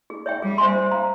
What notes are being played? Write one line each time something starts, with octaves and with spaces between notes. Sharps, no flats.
G#4
C#5 E5 G5
G3 G#4
C5 E5 G#5 C6
C5
F5 A#5